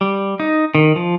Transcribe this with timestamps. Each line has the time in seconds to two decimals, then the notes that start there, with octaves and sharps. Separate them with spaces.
0.01 G3
0.40 D#4
0.75 D#3
0.96 F3